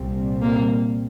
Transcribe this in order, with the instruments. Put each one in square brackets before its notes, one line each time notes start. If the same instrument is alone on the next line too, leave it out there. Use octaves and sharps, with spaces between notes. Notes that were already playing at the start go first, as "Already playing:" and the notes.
Already playing: [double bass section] C2 A#2 G3 C4
[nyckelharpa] A#3